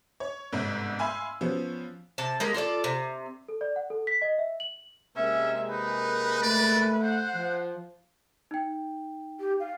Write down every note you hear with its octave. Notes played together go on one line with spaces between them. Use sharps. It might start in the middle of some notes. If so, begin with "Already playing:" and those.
C#5
G1 G#2 C3
E5 F5 G#5 B5 C6 E6
F3 B3 C#4
C3 A5
G#3 A#3 G4
F4 A4 C#5 D5
C3
A4
D5
F#5
A4
B6
D#5
E5
F#7
C3 G#3 A#3 C#4 E5
D#4 B4
A3 D5
C5 F#5
F3
D#4 G5
G4
F5